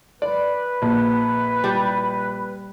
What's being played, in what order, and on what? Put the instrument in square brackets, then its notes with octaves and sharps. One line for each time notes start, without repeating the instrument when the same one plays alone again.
[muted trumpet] B4 [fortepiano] D5
[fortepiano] A#1
[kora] G3